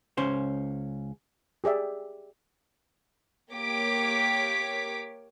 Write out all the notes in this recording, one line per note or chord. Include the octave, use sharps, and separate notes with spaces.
C#2 C#4 C5
G4 G#4 D5 E5
A#3 G4 C#5 D6 B6